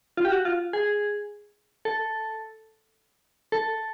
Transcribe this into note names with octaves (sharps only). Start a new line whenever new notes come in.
F4
G4
F#4
F4
G#4
A4
A4